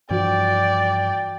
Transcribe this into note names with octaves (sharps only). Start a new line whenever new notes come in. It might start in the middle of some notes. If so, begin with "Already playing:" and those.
G2 E3 F3 F#4 D5 G5